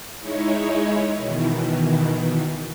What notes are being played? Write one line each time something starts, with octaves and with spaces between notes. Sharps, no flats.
G#3 D#4 E4 C#5
B2 D#3 E3